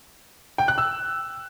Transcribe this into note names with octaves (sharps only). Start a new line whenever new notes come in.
G5
F#6
E6